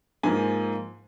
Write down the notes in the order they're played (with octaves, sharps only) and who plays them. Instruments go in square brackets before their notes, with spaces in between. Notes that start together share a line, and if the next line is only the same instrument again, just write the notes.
[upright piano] G#2 F3 A#3 G#5